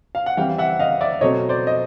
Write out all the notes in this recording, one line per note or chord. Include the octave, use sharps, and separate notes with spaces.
F5
F#5
E3 G3 C4 F5 G5
E5 F#5
D#5 F5
D5 E5
B2 F#3 A3 C4 C#5 D#5
C5 D5
D#5